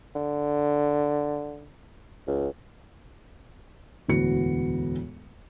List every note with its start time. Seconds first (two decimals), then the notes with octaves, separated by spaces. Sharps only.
0.15 D3
2.27 C#2
4.08 E1 D2 A2 B3 F#4 C#7